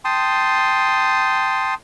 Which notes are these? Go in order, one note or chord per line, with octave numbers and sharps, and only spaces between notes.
G5 A5 C6 D#6